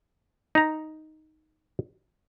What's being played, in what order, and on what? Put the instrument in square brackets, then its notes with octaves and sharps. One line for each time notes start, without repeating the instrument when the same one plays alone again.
[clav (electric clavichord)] D#4 A#5